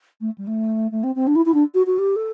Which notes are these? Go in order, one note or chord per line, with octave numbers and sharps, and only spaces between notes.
A3
G3
A3
A3
C4
C4
D4
E4
E4
D4
F#4
F#4
G4
A4